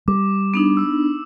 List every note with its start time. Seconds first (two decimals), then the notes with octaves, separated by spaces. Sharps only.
0.08 G3 D6
0.54 B3 D4 D#4
0.77 D6 E6